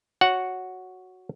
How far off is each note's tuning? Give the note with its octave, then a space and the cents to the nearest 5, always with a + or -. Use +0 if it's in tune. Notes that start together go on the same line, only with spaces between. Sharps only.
F#4 +0 C#5 +0 F#5 +0